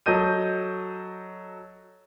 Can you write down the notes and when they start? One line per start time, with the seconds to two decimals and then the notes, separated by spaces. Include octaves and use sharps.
0.06 F#3 A4 D#5 G6 D#7